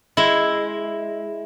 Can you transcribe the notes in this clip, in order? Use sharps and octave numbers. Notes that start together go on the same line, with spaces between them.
G#3 E4